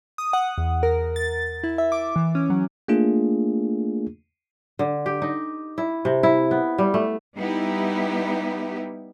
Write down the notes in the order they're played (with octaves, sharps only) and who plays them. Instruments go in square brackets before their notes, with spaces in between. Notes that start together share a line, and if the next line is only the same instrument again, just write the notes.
[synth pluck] D#6
F#5
E2
A#4
A6
E4
E5
D6
E3
C#4
F#3
[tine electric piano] A3 A#3 D4 F4 G#4
[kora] D3
G4
D#4
E4
C3
E4
B3
G3
A3
[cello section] G3 B3 D#4 E4 G4